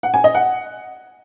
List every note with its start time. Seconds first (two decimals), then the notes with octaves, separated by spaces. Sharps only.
0.03 F#5
0.14 G#5
0.24 D#5
0.35 F#5